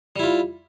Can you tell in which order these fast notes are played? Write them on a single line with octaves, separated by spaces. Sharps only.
G3 E4 F4